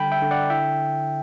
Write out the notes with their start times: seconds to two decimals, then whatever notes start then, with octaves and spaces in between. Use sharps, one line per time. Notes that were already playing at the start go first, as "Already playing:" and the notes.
Already playing: D3 G3 G5 B5
0.12 E5 G5
0.22 D3
0.31 D5 F#5
0.50 E4 E5 G5